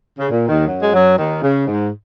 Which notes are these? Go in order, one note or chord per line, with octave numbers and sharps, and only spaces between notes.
C#3
A#2
D#2 D#3
F#2 F#3
G#3
F#2 F#3
D#2 D#3
C#3
G#2